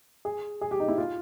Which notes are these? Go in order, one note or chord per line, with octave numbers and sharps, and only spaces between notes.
G#4
G#4
G4
D#4
E4
F4